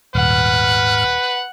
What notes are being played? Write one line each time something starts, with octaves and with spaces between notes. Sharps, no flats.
D#1 G#2 B4 F#5 F6